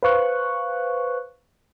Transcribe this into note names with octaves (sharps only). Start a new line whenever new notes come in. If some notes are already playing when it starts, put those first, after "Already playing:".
B4 C5 F5 C#6 F#6